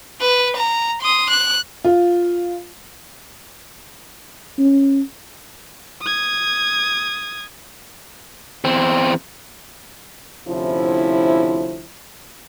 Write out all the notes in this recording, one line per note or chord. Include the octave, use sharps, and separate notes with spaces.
B4
A#5
C6 D#6
F#6
F4
C#4
D#6 G#6
E2 C4
D2 C3 F3 C#4 E4